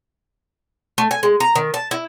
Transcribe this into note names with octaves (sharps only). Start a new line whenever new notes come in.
A3
G#5
G#3
A#5
D#3
A5
E4